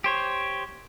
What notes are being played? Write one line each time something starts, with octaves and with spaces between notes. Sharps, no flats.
G4 C5 C#5